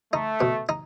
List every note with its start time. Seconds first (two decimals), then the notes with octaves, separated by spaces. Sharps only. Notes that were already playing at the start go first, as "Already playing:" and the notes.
0.13 A3 D#4
0.41 B2
0.69 D#4